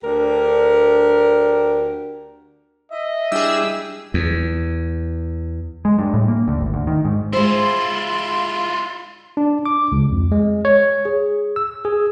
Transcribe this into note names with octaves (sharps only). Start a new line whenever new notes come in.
D2 D4 G4 A#4
D#5 E5
G3 D4 E4 G#4 E6
E2
G#3
G2
A2
A#3
D2
G#1
D2
D#3
G#2
G#3 E4 F4 C5 C6
D4
D6
C#2
F2
G#3
C#5
G#4
E6
G#4